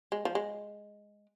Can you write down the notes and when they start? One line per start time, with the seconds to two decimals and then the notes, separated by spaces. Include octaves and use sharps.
0.12 G#3
0.25 F3
0.35 G#3